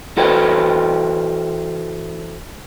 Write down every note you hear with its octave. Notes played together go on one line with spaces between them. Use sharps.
E3 F#4 A4 B4 C5 G5